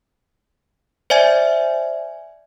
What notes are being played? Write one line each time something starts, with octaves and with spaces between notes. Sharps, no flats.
C5 D5 E5 G#5 G#6